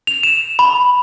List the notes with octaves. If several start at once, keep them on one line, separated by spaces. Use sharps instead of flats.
F7
E7
B5